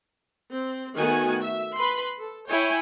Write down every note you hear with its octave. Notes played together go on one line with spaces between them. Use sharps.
C4
D#3 A3 B3 F#4 G#5
E5
B4 B5 C6
A4
E4 C#5 G5 G#5